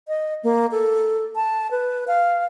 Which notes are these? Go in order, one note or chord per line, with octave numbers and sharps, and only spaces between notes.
D#5
A#3
A4
A5
B4
F5